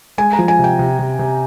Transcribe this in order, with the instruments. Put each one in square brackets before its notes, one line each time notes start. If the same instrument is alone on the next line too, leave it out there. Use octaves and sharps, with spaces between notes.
[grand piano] G#3 [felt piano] G#5
[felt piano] A#5
[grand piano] F3
[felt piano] G#5
[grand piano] C3 [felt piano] G5
[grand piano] C3
C3
C3